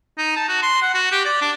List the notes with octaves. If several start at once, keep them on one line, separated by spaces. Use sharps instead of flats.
D#4
A5
F#4
C6
F#5
F#4
G4
D5
D4